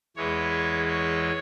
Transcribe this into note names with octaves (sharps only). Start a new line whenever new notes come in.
E2 E3 G#3 C#5
C#5